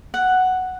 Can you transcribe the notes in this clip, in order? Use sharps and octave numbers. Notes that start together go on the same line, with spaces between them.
F#5